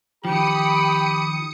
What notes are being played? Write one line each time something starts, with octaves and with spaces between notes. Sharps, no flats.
D#3 F3 G4 G5 B5 D#6 C#7